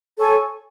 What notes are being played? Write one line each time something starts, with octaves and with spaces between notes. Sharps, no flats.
A4 C#5 G#5 C#6